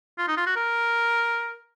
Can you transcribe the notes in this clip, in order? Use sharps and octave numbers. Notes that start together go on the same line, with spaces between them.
F4
D#4
F4
F#4
A#4